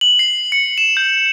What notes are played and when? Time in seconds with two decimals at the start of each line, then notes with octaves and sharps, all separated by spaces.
0.01 F#7
0.19 C7
0.52 C#7
0.78 E7
0.97 G6